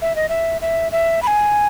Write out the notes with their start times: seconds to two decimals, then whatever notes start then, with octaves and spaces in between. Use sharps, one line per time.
0.02 E5
0.16 D#5
0.29 E5
0.61 E5
0.92 E5
1.22 B5
1.27 G#5